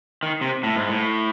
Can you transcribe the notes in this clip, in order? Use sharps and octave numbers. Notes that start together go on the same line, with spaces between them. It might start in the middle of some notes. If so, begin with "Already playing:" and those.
D#3
C3
A2
G#2
A2